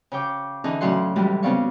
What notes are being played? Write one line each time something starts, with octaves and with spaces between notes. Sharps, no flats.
C#3 C#5 G5 D6
D3 E3 C#4 D#4 G#4
A2 C#3 F#3 D5 F#5 C6
F#2 A2 E3 G3 G#3
C#3 B3 C4 D5 F5 C#6